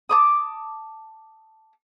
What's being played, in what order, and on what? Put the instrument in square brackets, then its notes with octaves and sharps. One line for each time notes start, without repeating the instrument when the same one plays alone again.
[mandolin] A5 D6 D#6